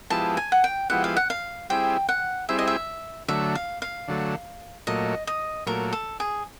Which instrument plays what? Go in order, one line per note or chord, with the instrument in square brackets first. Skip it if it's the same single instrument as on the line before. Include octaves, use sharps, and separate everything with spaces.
[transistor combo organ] F3 G#3 B3 E4 G4 [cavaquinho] A5
[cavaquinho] G#5
F#5
G5
[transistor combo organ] F3 G#3 B3 E4 G4 [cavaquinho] F#5
[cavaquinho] F5
F#5
F5
[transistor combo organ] G3 C4 E4 G#4 [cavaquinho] G5
[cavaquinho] F#5
[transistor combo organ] G3 C4 E4 G#4 [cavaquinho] E5
[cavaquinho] D#5
E5
[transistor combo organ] D3 F#3 A3 [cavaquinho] E5
[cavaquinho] F5
F5
[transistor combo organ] D3 F#3 A3
[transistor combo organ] A#2 F#3 A3 [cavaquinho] D#5
[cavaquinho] D#5
[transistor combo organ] A#2 F#3 A3 [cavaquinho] A#4
[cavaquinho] A4
G#4